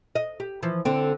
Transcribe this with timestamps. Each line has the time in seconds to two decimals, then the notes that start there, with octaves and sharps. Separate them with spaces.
0.15 D#5
0.40 G4
0.63 E3 F3
0.85 D3 C4